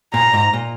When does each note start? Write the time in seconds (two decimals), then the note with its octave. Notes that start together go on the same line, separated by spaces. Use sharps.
0.13 A#2 A#5
0.33 G#2
0.53 A#2